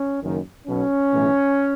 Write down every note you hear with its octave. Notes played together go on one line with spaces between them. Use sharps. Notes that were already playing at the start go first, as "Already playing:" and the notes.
Already playing: C#4
F#1 F#2 D#3
B1 B2 C#4
B1 A2 E3